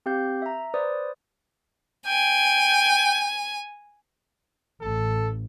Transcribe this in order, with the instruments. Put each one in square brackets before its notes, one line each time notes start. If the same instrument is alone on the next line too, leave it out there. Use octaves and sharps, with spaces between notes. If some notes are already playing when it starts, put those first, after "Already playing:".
[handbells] C4 G4 F5 G6
E5 A#5
B4 C5 D5 D#6
[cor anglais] G5 [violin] G#5
[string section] A1 [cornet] A4